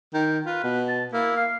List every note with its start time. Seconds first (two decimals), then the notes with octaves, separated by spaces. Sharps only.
0.14 D#3 G5
0.46 F4 B4
0.64 B2
0.88 A5
1.13 A#3 E4
1.37 F5